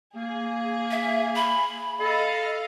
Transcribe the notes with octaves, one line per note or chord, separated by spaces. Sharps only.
A#3 G#4
E5
B5
A4 D#5 F5